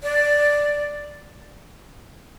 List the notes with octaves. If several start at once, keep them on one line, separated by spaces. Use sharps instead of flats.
D5